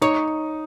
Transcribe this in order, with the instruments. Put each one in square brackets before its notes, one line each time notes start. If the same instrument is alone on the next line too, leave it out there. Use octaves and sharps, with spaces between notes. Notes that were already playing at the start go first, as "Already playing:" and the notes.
[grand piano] D#4 [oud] C#5